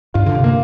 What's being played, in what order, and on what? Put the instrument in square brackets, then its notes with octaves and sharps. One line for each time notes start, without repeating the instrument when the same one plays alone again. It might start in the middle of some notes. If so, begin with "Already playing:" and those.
[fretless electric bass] G2 [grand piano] F4
[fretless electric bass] D3
C3
[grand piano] A#3